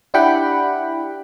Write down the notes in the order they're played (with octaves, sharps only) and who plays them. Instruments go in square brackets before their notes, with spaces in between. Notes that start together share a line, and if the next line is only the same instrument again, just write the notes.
[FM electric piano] D4 E4 G4 F#5 G5 B5